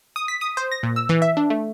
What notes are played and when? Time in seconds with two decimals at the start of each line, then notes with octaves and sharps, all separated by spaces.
0.16 D#6
0.28 B6
0.41 D#6
0.57 C5
0.72 A#6
0.83 A#2
0.96 E6
1.09 E3
1.22 E5
1.37 D4
1.50 A3